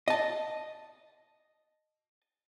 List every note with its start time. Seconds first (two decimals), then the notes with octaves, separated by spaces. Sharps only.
0.08 D#5 A5